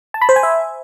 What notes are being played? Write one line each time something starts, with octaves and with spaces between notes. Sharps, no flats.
A5
B5
C5
G#5
E5